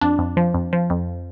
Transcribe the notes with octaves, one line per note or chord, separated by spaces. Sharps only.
F2 D4
F2
F3
F2
F3
F2